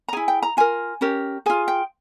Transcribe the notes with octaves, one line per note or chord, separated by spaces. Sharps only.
A#5
E4 G#4 G#5
G5
A#5
F4 A#4 G#5
C#4 G4 A#4
F4 G#4 G#5
G5